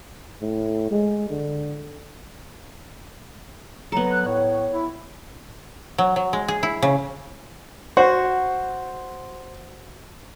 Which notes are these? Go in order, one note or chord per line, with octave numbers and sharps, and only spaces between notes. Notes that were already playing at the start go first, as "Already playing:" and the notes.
A2
G#3
D3
F#3 B3 A4 A#5
F#6
A2 C#5
E4
F#3
F#3
G#3
G#4
E4
C#3
F#4 C5